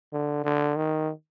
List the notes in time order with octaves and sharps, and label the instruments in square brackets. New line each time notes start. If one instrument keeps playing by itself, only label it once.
[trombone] D3
D3
D#3